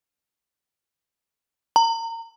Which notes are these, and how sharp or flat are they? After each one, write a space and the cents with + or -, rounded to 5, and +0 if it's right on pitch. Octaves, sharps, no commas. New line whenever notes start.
A#5 -30